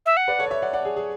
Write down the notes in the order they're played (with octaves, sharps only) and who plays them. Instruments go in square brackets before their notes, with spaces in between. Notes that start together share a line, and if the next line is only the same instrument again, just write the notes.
[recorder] E5
F#5
[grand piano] B4 D5
A4 C#5
D5
C#5 E5
D5 F#5
D5 F#5
G#4
G#4